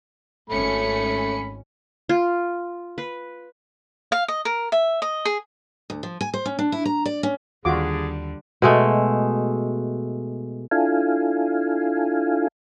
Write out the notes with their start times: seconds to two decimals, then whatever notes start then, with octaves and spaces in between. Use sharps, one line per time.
0.50 G#1 A3 C#4 B5 C#7
2.09 F4
2.98 B4
4.12 F5
4.28 D#5
4.45 A#4
4.72 E5
5.02 D#5
5.25 G#4
5.90 D2
6.03 F3
6.21 G#5
6.34 C5
6.46 C#4
6.59 D4
6.72 E4
6.85 A#5
7.06 D5
7.23 C#4
7.65 D#2 D3 G3 F4 F#4 G#4 D6
8.62 B2 G#3 A3
10.71 D4 E4 F4 A4 F5 G#5